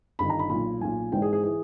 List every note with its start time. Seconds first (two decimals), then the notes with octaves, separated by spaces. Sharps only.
0.19 G1 G2 D#3 B5
0.30 A#5
0.39 B5
0.50 B1 A#2 B5
0.81 B1 A#2 G#5
1.12 G#1 G#2 E3 G5
1.22 G#4
1.33 G#4
1.44 E3 G#4